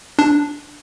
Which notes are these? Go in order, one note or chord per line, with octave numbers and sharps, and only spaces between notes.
D4